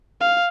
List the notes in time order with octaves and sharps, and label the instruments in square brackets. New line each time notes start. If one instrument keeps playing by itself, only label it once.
[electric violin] F5